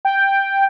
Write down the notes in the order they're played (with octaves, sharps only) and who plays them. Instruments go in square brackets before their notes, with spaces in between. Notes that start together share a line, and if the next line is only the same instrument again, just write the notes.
[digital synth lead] G5